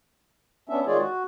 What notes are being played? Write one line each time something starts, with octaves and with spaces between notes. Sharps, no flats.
B3 C#4 D4 E5
D#3 G#3 F4 G#4 C#5 D5
F#4